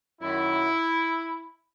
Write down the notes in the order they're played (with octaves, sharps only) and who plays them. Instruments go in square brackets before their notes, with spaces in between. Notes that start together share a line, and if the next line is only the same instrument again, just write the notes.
[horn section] F#2 D#3 F#3 E4